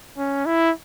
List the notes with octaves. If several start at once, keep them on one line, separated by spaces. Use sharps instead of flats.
C#4
E4